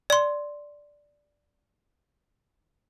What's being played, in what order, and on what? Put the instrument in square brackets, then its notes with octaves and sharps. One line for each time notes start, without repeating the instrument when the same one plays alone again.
[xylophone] D5 C6